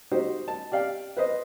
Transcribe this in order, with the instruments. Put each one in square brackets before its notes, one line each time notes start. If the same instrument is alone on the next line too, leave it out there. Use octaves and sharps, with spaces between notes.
[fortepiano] D#4 F#4 G4 C5
A5
G4 D5 F5 G5
B4 C5 D#5